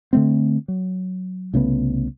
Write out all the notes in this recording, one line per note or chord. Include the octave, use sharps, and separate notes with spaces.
D3 A3 C4
F#3
C2 C#3 A3 B3